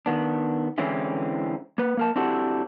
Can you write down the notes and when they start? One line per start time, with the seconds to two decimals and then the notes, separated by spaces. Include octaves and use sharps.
0.06 D#3 B3 D4
0.78 D3 E3 G#3 C4 C#4 E4
1.78 A#3 B4
1.97 A#3 A#4 A5
2.16 C4 D4 E4 F#4 G4 A4